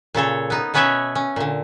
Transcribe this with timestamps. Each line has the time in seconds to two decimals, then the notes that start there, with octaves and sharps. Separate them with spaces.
0.14 A#2 C#3 A4 C#5
0.50 B3 D#4
0.74 B2 B3 C#4 B4 C#5 E5
1.15 C#4
1.36 A#2 D3